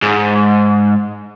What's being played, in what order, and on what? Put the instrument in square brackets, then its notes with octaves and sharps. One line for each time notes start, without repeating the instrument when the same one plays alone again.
[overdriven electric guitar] G#2